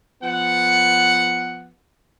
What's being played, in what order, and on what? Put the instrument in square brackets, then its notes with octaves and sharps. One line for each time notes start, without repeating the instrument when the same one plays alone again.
[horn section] F3 B3 F#5